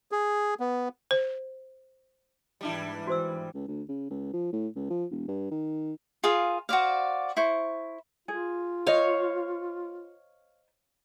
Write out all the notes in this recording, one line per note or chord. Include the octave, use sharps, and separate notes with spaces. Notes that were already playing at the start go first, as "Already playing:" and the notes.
G#4
B3
C5
G#2 E3 G3 D4 E4
F#4 C5 E6
C#2
D2
C#3
C#2
F3
A2
C#2
F3
E1
G2
D#3
F4 G#4 A#4 F5
F#4 C5 D5 F5
E4 C5 C#6
F4 G#4
C5 C#5 D#5 F5